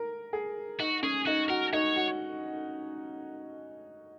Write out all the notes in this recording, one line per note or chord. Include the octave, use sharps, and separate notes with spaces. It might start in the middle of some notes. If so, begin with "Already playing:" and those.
Already playing: A#4
G#4
D#4 F#4
C#4 G#4
D#4 F#4
F#4 A#4
D#4 C#5
F#4